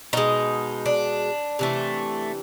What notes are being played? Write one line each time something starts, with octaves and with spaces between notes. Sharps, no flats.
B2 G#3 D#4
D4
C3 E3 A3